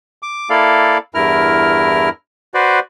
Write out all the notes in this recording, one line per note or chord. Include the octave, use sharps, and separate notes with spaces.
D6
A#3 E4 A4 D5 F5
E2 G2 E4 A#4 F6
F#4 B4 C5 D5